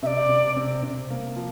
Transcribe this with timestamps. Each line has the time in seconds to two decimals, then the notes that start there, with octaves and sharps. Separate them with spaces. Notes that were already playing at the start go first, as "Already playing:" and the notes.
0.03 C3 E5
0.07 D5
0.29 C3
0.56 C3
0.83 C3
1.10 A#3
1.36 F3